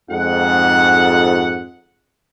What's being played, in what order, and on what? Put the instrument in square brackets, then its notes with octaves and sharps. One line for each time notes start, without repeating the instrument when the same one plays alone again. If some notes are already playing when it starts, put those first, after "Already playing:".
[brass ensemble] F2 G#2 F#5